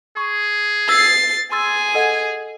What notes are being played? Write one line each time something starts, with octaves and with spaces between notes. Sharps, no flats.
G#4 C#6
E6 A6 C7
G#4 G#5 C6 E6 A6
A4 D#5 F#5